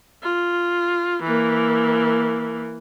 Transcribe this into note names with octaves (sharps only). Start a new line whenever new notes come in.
F4
E3 A#3